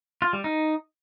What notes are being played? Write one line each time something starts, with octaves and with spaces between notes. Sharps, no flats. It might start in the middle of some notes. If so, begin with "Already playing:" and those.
F4
G3
D#4